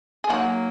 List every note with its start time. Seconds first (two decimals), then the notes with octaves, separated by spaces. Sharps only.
0.24 G#4
0.29 F#3 A#3 D#4 F#4